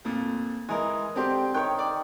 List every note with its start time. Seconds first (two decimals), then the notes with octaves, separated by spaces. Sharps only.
0.05 F2 A#2
0.69 E3 G#3 A#4 D#5
1.16 D3 C4 G4 G5 C6
1.54 D#3 C#5 G5
1.78 D5